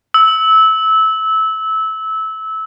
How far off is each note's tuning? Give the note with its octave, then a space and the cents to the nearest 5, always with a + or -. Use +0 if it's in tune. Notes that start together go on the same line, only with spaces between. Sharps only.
E6 -20